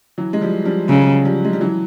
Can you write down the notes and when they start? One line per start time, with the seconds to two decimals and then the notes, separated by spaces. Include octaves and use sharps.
0.18 E3 F#3
0.33 G#3
0.41 F3 G3
0.65 F3 G3
0.89 C#3 F#3 G#3
1.25 F3 G3
1.45 G#3
1.53 G3
1.61 E3 F#3